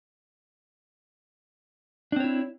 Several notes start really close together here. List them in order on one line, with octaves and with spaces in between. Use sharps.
D4 C4 C#5 E4